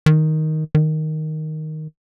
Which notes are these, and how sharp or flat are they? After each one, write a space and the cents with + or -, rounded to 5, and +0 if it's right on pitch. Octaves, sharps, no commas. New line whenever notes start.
D#3 +5
D#3 +0